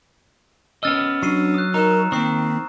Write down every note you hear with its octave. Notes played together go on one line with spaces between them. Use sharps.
B3 C#4 D#5 E6 F6 A6
F#3 D4 C#6 C7 D#7
D#6 F#6
D#4 A#4 A#5 F#6 E7
D#3 A#3 C4 C#6 D#6 C7